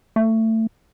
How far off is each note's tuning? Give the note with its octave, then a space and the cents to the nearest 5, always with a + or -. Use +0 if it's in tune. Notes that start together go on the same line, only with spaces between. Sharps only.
A3 +25